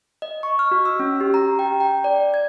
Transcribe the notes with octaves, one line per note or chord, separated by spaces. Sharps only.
D#5
C#6
F6
F#4
E6
C#4
G4
A#5
G5
G5
D5
G#6